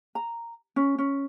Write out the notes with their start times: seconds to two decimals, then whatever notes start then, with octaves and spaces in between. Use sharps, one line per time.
0.15 A#5
0.76 C#4
0.98 C#4